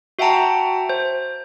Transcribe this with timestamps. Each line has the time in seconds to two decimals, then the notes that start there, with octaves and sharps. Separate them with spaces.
0.19 F#4 E5 F#5 G5 A5 A#5
0.89 C5